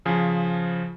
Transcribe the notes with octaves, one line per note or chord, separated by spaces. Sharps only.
C#3 F3 G#4